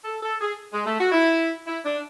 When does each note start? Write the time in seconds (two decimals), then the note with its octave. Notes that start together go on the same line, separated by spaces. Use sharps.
0.04 A4
0.22 A4
0.40 G#4
0.72 G#3
0.85 A3
0.99 F#4
1.12 E4
1.67 E4
1.84 D4